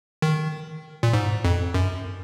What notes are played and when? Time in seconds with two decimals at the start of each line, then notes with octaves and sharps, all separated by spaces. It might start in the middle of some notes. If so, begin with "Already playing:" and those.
0.22 D#3
1.03 A#2
1.13 G#2
1.45 F2
1.74 F#2